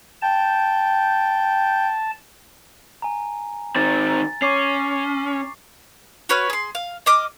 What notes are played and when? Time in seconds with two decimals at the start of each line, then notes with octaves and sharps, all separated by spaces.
0.22 G5 A5
3.02 G#5 A#5
3.76 D#3 C4 A6
4.42 C#4 C#6 D6 C7
6.29 F#4 B4 C#5 F6
6.50 G#4 C6
6.75 F5
7.06 D#5 D6 F6